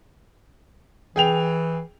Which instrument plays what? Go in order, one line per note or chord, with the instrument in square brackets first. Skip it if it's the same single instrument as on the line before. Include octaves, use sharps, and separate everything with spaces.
[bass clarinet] E3 [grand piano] G#4 G5 F7